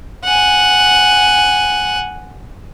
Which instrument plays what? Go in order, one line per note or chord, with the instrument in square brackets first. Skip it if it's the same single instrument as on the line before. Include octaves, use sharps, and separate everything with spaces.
[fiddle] F#5 G#5